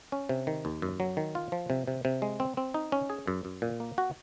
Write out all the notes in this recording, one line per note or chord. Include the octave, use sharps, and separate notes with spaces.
C#4
C3
D#3
D#2
F#2
F#3
D#3
F4
F3
C3
C3
C3
G#3
C4
C4
D#4
C#4
G#4
F#2
F#2
A#2
A#3
F#4